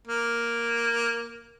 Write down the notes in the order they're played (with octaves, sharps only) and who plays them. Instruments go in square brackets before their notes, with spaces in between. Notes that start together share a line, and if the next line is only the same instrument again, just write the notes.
[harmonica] A#3